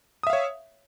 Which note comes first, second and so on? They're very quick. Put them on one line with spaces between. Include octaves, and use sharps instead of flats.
D#6 E5 F5 C#5